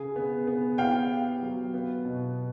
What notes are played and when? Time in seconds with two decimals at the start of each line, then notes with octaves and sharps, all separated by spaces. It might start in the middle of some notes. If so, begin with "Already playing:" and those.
Already playing: C#3 G#4
0.16 B3
0.47 B3
0.78 E4 F5 G5
1.10 G4
1.42 F#3
1.74 B3
2.05 B2